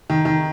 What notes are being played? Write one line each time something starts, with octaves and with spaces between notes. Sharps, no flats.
D#3
D#3